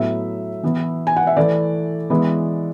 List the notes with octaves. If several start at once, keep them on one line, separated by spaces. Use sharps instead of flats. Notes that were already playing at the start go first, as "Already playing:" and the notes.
Already playing: A2 F#3 B3 E4 E5
E3 B3 E4
G#5
F#5
E5
E3 A3 E4 D5
E3 G#3 B3 E4